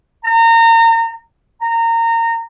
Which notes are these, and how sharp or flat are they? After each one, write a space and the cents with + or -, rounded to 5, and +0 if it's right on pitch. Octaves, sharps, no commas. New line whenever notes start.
A#5 -30
A#5 -25